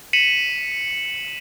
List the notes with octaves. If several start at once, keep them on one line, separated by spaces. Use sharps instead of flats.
B6 C#7 D#7 E7 F#7